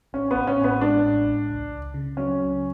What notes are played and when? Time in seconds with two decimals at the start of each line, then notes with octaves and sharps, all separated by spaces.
0.13 A1 C#4
0.31 A1 B3
0.47 C#4
0.58 A2
0.64 B3
0.81 G#3 D4
1.05 A1
1.27 A1
1.49 C#2
1.72 C#2
1.94 C#3
2.17 F#3 C#4
2.39 C#2